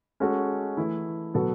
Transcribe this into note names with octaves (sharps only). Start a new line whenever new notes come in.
G#3 C#4 F#4 A4
E3 A3 E4 A4
B2 F#3 B3 F#4 A4